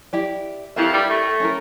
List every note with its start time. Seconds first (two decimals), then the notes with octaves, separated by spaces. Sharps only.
0.13 E4 G4 D5
0.76 F2 F3 E4 G4 A#4 E5
0.92 G2 G3
1.08 A2 A3
1.40 C#4 E4 A#4